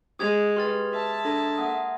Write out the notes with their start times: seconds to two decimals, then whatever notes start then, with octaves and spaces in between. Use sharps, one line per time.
0.19 G#3 D#6 G#6 F7
0.56 G4 B4 C6 F6 A6
0.92 E5 A5
1.25 D4 A4 A#5 A#6
1.58 A#3 F#5 D#6